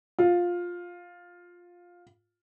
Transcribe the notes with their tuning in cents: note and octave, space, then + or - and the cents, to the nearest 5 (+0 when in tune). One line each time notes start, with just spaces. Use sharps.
F4 +10